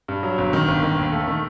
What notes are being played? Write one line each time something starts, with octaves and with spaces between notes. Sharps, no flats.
G2
F#3
G1
D#3
G1
D#3
D#2
A3
D#3